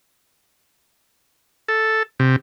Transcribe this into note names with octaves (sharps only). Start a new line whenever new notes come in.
A4
C3